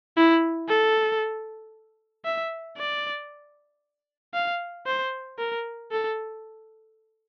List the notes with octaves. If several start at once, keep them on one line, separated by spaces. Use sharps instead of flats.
E4
A4
E5
D5
F5
C5
A#4
A4